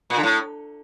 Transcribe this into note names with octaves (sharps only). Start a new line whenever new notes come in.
A#2
D3
A2